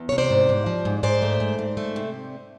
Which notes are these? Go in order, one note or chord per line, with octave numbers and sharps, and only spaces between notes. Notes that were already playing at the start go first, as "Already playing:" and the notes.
Already playing: E2
C3 C#5
C5 D5
G#2
G#2
F3
G#2
G#2 C5 D5
A3
G#2
G#2
A3
C3